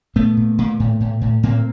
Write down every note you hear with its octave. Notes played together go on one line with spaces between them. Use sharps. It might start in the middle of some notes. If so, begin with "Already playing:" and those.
A#2 A3 B3
A#2
A#2
A2
A2
A2
A2 A#3 C4